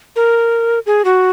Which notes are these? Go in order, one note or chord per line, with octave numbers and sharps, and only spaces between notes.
A#4
G#4
F#4